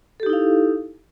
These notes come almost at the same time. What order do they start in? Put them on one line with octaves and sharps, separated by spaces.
A4 G4 D#4 E4 F5